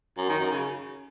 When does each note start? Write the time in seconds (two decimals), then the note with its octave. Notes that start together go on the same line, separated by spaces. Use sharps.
0.17 F#2
0.29 D#3
0.40 F#2
0.51 C#3